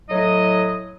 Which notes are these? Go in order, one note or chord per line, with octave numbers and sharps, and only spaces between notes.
A2 F#3 E4 D#5 D#6